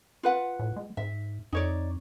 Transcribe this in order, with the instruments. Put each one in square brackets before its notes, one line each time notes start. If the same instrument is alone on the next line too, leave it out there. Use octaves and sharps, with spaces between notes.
[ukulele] F4 B4 F#5
[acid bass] A2
G#3
[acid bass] G#2 [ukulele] E5
[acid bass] F2 [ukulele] D#4 C#5 D5